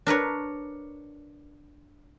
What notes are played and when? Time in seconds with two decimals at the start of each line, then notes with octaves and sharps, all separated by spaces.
0.06 D4 A#4 B4 C#5